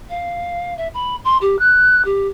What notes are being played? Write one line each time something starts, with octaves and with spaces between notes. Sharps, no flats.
F5
E5
B5
C6
G4
F#6
G4